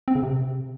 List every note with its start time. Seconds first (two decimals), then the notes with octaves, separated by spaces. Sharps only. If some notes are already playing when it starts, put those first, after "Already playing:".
0.08 C4
0.15 C#3
0.23 C3